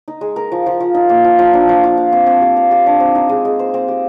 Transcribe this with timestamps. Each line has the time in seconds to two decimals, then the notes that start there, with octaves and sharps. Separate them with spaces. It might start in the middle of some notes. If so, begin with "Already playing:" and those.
0.08 D#4
0.21 G#3
0.36 A#4
0.52 F3
0.66 F3
0.80 F3
0.94 D#4
1.09 A#3
1.24 F3
1.39 F3
1.53 D4
1.69 F3
1.84 F4
1.98 F5
2.12 C4
2.27 C4
2.42 G4
2.57 F5
2.71 G4
2.86 D4
3.00 C4
3.15 D#4
3.29 G#3
3.45 G#3
3.59 C5
3.74 C4
3.88 G4